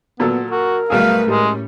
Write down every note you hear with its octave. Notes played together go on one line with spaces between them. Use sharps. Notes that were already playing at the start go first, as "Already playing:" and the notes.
A#2 F#3 B3 A4
F#4 A#4
B1 G3 A3 G#4 B4 F5
A2 G3 G#3 C#4